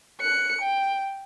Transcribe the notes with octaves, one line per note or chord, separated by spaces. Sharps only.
F#6 C#7
G5